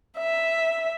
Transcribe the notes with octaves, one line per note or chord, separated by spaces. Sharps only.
E5